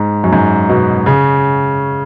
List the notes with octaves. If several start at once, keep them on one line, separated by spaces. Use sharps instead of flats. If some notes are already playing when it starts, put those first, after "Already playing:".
Already playing: G#2
F#2
G#2
B2
C#3